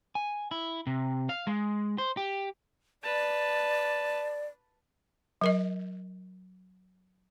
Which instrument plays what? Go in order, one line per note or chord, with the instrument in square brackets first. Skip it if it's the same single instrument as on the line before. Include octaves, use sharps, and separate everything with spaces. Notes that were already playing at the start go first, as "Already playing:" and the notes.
[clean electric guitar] G#5
E4
C3
F5
G#3
C5
G4
[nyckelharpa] B4 A5 [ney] D5
[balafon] F#3 A#4 D#5